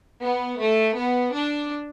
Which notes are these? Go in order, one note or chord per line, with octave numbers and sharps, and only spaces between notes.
B3
A3
B3
D4